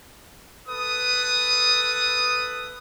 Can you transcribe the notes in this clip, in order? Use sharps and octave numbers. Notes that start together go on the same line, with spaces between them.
A4 B4 D#6